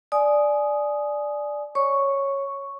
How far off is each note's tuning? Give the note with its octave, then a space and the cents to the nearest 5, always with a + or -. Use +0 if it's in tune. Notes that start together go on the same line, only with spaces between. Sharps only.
D5 +0 G#5 +20 D#6 +0
C#5 -5 C#6 +0